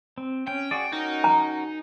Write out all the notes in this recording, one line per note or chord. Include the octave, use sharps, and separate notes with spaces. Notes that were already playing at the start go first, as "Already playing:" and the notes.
C4
C#4 G5
F#4 G#4 D5
C#4 D#4 F#4 A#4
A#5